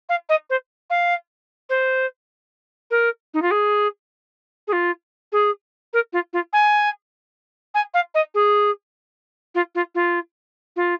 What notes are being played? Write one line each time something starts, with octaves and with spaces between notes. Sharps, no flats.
F5
D#5
C5
F5
C5
A#4
D#4
F4
G#4
G#4
F4
G#4
A#4
F4
F4
G#5
G#5
F5
D#5
G#4
F4
F4
F4
F4